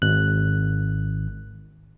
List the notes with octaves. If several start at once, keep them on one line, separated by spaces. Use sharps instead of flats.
G#1 F#6